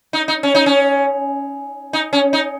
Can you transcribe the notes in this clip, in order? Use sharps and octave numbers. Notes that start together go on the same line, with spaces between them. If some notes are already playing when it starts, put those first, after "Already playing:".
D#4
D#4
C#4
D#4
C#4
D#4
C#4
D#4